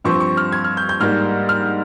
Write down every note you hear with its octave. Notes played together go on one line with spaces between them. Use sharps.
G2 F3 C4 C#6
C#6
F6
G#6
F6
G6
G6
G#2 G3 A#3 F6
F6